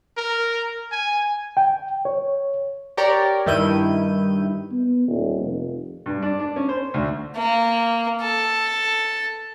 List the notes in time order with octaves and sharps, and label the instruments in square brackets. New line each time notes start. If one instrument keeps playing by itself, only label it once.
[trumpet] A#4
G#5
[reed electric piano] G5
C#5
[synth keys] G4 A#4 C#5 D5
G2 D#3 E4 G6 D#7
[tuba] B3
D#1
F1
[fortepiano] G2
D4
D4
C#4
C5
D2
[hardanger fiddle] A#3
A4